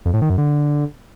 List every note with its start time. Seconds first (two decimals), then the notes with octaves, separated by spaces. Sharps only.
0.05 F2
0.14 A2
0.22 D#3
0.30 F#2
0.38 D3